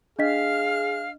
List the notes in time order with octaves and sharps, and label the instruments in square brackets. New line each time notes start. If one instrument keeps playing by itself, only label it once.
[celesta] D4 D#5 B6 [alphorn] G#4 [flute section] F5 F6